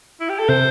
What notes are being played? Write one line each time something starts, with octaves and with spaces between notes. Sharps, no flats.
E4
G4
A4
C3 C5